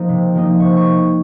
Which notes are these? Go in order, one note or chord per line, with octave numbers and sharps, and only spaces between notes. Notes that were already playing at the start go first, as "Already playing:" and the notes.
Already playing: F3 A#3 D#4
C3
F3 A#3 D#4
C3 C#6
C#6